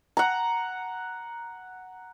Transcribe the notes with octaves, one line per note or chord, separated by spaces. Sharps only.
F#5 A#5